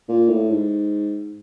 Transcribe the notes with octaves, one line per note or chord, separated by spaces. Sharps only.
A#2
A2
G#2